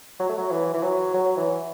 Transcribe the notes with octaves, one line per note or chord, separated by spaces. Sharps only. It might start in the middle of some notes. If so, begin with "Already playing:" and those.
F#3
A3
F#3
E3
E3
F#3
F#3
E3